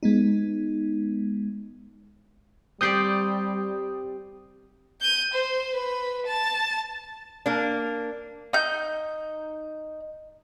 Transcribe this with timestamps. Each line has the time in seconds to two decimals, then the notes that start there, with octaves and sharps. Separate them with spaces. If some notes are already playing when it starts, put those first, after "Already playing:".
0.03 G#3 B3 D#4
2.81 G3 C4 G4 D5 D#6 G6 C7
5.01 G6 D#7
5.34 C5
5.75 B4
6.27 A5 A6
7.46 A#3 D4
8.53 D#4 G6